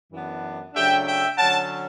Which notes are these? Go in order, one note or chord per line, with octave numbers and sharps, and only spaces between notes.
F#2 E3 B3 D4
C#3 F#3 A3 D4 E5 G5
E5 G5
D3 F#3 C#4 F#5 A5